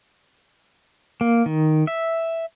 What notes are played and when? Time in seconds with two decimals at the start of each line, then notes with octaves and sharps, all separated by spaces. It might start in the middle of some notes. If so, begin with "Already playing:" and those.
1.21 A#3
1.46 D#3
1.87 E5